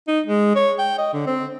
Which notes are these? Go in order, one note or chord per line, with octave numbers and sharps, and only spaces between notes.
D#4
G#3
C#5
G5
D#5
D3
C4